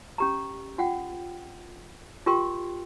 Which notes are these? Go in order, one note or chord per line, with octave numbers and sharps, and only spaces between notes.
C#4 G4 A#5
F4 F#5 G5
F4 G4 A#4 G5 C6